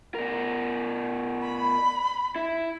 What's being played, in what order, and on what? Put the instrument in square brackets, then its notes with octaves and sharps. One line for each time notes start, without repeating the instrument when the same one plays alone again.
[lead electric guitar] B2 A#4
[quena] B5
[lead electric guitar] E4